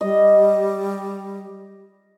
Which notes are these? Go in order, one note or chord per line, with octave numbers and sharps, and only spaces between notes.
G3 D#5